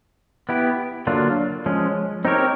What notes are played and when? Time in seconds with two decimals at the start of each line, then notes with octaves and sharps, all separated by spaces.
0.49 B3 E4 G4
1.07 D3 F#3 A#3 D4 F4
1.66 F3 G#3 C#4
2.25 C4 D#4 G4 A#4 C#5